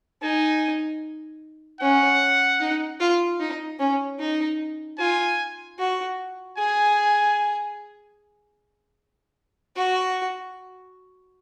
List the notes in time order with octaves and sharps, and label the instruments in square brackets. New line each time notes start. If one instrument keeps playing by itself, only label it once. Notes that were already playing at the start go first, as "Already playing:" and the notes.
[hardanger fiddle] D#4 [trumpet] G#5
[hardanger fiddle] C#4 [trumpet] F#5
[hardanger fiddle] D#4
F4
D#4
C#4
D#4
[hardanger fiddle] F4 [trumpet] G#5
[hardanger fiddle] F#4
[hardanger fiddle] G#4 [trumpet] G#5
[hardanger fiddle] F#4